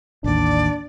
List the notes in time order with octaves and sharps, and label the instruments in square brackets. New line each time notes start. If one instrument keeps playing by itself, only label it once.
[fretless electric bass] A1 D#2 [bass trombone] D4 [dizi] D5